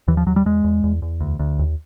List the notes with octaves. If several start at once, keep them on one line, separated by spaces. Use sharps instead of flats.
D#2 E3
F3
D#2 F#3
G3
E2 G#3
E2
E2
E2
D2
D2
D#2